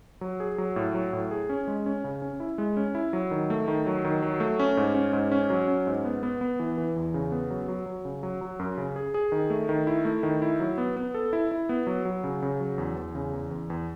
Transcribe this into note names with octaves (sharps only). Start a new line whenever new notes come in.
F#3
G#4
F#3
A2
F#3
A2
G#4
C#4
G#3
C#4
C#3
C#4
E4
G#3
C#4
E4
F#3
D#3
A3
D#3
F#3
D#3
F#3
A3
C#4
G#2
C#4
G#2
C#4
F#3
C#4
G#2
B3
B3
B3
E3
E3
E2
C#3
B3
F#3
F#3
F#3
C#3
F#3
F#3
F#2
C#3
G#4
G#4
D#3
A3
D#3
E4
A3
D#3
E4
F#3
B3
B3
A4
E4
E4
B3
F#3
F#3
C#3
C#3
F#3
E2
E2
C#3
E2
E2
E2